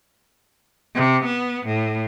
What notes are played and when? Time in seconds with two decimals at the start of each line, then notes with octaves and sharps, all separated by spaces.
0.95 C3
1.25 B3
1.67 A2